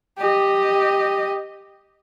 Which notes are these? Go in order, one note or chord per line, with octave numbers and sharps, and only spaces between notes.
G4 D#5